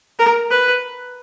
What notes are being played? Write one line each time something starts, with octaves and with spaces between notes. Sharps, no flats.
A#4
B4